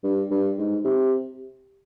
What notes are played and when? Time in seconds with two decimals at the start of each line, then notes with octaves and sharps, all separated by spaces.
0.04 G2
0.31 G2
0.58 G#2
0.85 C3